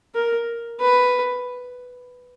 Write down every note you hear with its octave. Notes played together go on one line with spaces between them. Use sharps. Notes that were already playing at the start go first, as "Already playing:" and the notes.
A#4
B4